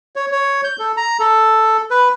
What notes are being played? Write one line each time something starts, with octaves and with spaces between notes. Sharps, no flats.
C#5
C#5
G6
A4
A#5
A4
B4